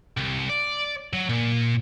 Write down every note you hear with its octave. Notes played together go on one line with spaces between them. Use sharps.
C2
D5
F#3
A#2